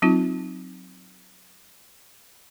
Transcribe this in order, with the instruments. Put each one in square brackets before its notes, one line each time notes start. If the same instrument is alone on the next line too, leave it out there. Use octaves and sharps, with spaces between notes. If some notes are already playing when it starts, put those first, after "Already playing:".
[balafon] F#3 C4 D#4 F4